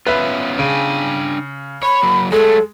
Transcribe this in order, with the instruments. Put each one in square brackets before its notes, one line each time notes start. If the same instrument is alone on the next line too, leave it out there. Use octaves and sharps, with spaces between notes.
[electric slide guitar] B3 C#4 F4 [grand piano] B4 E5
[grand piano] C#3 [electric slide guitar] D4 G5 G#5
[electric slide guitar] C#5 [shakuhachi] B5
[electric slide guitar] F#3 A#3
[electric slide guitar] F#3 A3 [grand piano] G#3 [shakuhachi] A4